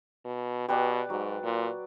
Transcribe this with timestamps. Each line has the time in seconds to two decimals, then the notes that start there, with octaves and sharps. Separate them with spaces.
0.25 B2
0.68 B2 G4 B4 D5
1.10 G#2 F#3
1.43 A#2